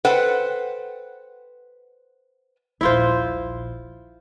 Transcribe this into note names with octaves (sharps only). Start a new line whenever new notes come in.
A4 B4 C5 F#5 G5
D#1 A#1 E4 F4 C5